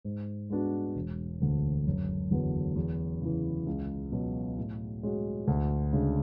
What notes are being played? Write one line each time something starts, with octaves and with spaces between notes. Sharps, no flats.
G#2
G#3 B3 D4 F#4
E1
D2 D3
F#1
E2 D3 F#3 B3
E2
C#3 E3
C#2
B2 F#3
A2
G#3 C#4 F#4
D2
C#3 G#3 D4